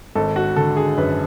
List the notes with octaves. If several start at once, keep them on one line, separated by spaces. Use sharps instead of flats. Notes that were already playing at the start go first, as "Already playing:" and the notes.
G#1 A4
F#4
D3 A4
G#4
F#2 B4